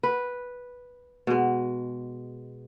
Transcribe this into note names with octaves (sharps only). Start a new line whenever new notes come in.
B4
B2 G#3